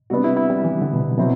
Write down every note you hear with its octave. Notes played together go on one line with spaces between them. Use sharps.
C3 G3 B3 D4 F#4
E4
E4
G3
E3
D3
B2
C3
B2 F#3 C4 E4